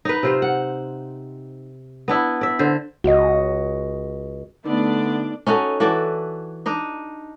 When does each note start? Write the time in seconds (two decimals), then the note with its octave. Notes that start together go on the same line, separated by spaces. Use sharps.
0.05 D#4 B4
0.23 C3 F4 C5
0.42 F#5
2.08 B3 D4 E4
2.41 D5 E5
2.59 D3 C5
3.04 C#2 F#4 D#5
4.65 D3 A3 B3 D4 D#4 D5
5.47 C#4 D#4 F#4 A4
5.80 E3 F#4 A4 D5
6.66 D4 D#4 D#5